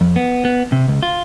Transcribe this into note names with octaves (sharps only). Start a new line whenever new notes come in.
F2
B3
B3
C3
C#2
F4